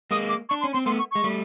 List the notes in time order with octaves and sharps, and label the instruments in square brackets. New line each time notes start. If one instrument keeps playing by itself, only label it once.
[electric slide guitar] G#3 A#3 [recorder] D#6
[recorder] D6
[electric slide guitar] D4 [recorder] C#6
[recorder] C6
[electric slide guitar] C#4
[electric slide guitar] C4 [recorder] C6
[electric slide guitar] A3 B3 [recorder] C6
[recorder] C#6
[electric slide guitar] G#3 [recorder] C#6
[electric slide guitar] G3 A3